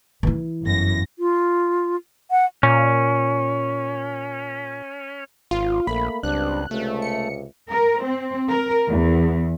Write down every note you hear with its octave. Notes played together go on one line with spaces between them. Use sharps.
E3 E4
G1 F#2 A#6
F4
F#5
A#2 C#4
G#1 F4
A#1 A3 A#3 B5
C#2 G2 C4 D4 F#6
C#2 C3 A3
C#7
A#4
C4
A#4
E2